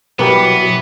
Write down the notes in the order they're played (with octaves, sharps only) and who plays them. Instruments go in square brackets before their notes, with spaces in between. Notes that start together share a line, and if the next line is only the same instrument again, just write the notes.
[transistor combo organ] B2 F#3 [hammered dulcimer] E3 G3 [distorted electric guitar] B3 [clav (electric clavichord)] G4 A#4 B4